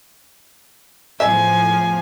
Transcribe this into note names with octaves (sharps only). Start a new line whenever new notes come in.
E2 A2 F3 E5 G#5